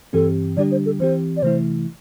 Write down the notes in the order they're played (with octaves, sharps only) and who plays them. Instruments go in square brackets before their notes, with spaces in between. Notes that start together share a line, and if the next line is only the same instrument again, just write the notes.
[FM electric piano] G2 E3 C4 G4 [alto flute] A4
[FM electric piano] D3 G3 D4 G4 [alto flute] D5
[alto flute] C5
A4
[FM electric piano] E3 C4 G4 [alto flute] C5
[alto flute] D5
[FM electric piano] C3 E3 A3 E4 [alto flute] C5